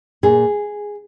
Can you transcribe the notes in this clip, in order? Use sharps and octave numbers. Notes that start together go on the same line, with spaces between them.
A#2 G#4